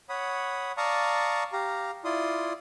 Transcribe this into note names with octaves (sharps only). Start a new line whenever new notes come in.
C#5 F#5 B5 D#6
D5 F5 A5 A#5 C#6 D#6
G4 F5 A#5
E4 F4 D5 C6 D#6